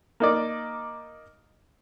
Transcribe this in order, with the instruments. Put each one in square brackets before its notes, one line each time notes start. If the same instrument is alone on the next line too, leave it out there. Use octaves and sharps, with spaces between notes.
[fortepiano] A#3 D#4 D5